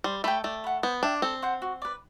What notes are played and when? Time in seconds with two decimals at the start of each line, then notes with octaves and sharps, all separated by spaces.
0.04 G3 C5
0.24 A3 G5 B5
0.44 A3 D5
0.64 F#5 B5
0.83 B3 C5
1.03 D4 E5 G5 D6
1.22 C4 A4
1.42 C5 F#5 C6
1.62 F#4
1.82 B4 D5